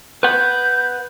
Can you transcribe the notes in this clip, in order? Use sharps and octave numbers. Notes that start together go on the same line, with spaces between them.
B4 F#5 G6